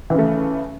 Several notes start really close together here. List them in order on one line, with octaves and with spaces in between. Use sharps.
E3 C#3 A3